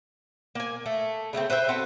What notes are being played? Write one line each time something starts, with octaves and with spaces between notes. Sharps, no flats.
A#3 G#5
A3
C#3 A3 A#3 C4
B4 C5 E5 G5
C4 F#4 A4 B4